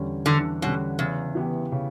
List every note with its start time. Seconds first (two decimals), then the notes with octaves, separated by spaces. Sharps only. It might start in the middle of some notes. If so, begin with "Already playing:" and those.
Already playing: E2 D3 G3 C#4
0.26 E2 D3
0.62 B2 D3 G3 C#4
0.99 E2 C#3
1.35 E3 B3 E4 G4
1.72 C#3